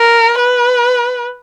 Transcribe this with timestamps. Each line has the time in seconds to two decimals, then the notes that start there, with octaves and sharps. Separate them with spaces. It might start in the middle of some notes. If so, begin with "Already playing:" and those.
Already playing: A#4
0.39 B4